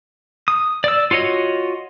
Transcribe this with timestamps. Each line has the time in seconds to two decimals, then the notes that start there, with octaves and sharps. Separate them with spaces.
0.48 D#6
0.84 D5 E6
1.11 F4 F#4 C#5 D#5